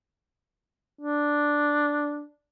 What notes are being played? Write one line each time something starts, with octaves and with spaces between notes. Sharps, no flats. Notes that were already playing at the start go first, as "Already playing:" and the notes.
D4